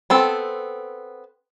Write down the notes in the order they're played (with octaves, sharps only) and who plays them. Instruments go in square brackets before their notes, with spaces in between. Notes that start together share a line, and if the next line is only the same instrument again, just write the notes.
[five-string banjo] B3 C4 A4